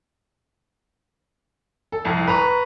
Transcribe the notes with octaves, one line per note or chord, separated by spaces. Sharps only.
A4
C2 F2
B4 A#5 C#6